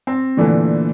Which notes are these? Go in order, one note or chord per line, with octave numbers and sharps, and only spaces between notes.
C4
A#2 D3 E3 A3